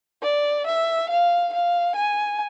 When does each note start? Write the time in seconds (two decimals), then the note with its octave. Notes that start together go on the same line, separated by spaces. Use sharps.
0.23 D5
0.66 E5
1.09 F5
1.53 F5
1.96 G#5